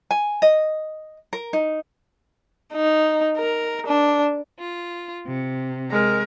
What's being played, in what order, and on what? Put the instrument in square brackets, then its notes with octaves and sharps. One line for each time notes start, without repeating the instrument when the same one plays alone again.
[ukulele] G#5
D#5
A#4
D#4
[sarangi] D#4
A#4
D4
[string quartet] F4
C3
[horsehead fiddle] G#3 A#4